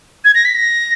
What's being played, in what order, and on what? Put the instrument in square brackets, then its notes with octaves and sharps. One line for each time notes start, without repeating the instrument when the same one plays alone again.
[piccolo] G#6
A#6
B6
A#6